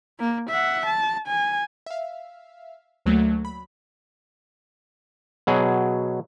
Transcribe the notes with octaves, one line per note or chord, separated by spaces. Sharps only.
A#3
E5 F#5
A5
G#5
E5 F5
D2 F#3 A3 A#3
B5
B2 F#3 G#4